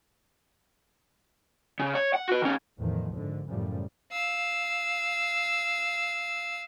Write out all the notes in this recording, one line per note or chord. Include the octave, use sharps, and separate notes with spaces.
C#3
C#5
F#5
F#4 B4
D#3 C#4
E2 A2 D#3 F3
G#1 G#2 D3
F#2 A2 C#3 F3 G3
F5 E6